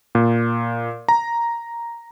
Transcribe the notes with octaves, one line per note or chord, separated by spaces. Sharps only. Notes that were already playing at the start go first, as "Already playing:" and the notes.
A#2
A#5